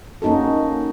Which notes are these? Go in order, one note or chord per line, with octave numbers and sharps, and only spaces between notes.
A#3 C#4 D#4 F#4 A4